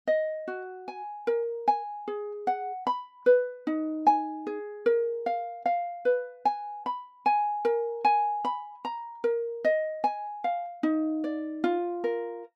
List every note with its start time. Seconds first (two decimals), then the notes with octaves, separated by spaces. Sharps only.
0.08 D#5
0.48 F#4
0.88 G#5
1.27 A#4
1.68 G#5
2.08 G#4
2.47 F#5
2.87 B5
3.26 B4
3.67 D#4
4.07 G#5
4.47 G#4
4.86 A#4
5.26 F5
5.66 F5
6.05 B4
6.45 G#5
6.86 B5
7.26 G#5
7.65 A#4
8.05 G#5
8.45 B5
8.85 A#5
9.24 A#4
9.65 D#5
10.04 G#5
10.44 F5
10.83 D#4
11.24 D5
11.64 F4
12.04 A#4